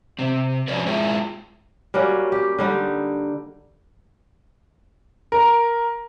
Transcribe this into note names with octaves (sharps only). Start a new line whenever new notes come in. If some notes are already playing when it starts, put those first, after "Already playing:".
C3 C4
F3 C#4 F#4 B4 C#5 D5
G#3 E4 F4 G#4 E5 G5
G3 A#3 C#4 F#4
G4
D3 G3 D#4
A#4